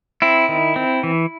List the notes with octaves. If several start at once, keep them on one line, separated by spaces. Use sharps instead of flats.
C4 E4
D#3
C4
E3